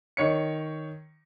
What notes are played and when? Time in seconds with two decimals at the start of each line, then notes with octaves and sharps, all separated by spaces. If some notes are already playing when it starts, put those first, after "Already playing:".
0.17 D#3 C#5 C#7